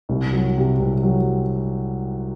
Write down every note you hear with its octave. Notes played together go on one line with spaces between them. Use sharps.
C2
F#3
C3
C2
F#3